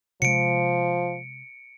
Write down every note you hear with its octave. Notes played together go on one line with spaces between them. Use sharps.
C3 F3 G#3 C#7 D7